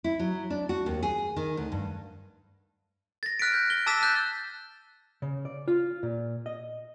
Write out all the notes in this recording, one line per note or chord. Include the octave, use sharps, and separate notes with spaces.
E4
F#3
D4
F#4
D#2
G#4
D#3
D2
G2
A6 A#6
F6 F#6 B6 D7
G6
G7
A5 D6 E6 A6 B6 E7
F#6 G6
C#3
D5
F4
A#2
D#5